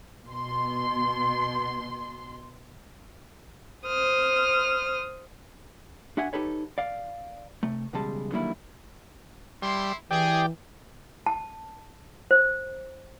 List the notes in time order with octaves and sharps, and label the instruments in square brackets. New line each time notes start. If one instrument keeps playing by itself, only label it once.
[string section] B2 C6
[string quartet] C5 D#6 F6
[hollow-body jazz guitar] D4 F#4 E5 F#5 G#5
D#4 G4 A4 B4 C#5
D5 F5
C3 A3
B1 E2 C#3 G3 G#3 A5
D3 D#3 F#3 G3 A#3 E4
[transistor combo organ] G3 [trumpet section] E4 C6
[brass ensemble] E3 [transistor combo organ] G4 D5 G5 [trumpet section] G#4
[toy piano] A5
C5